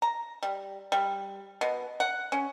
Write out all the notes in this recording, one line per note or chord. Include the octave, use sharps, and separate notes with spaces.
A#5
G3
G3
B2
F#5
C#4